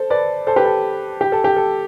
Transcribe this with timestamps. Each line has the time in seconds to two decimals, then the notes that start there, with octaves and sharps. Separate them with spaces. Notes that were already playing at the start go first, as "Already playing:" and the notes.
Already playing: A4 C5
0.10 B4 D5
0.47 A4 C5
0.56 G4 B4
0.65 A4
1.21 G4
1.32 A4
1.44 G4
1.56 A4